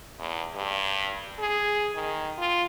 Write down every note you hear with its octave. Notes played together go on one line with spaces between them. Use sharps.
E2
G2
G#4
D#3
F4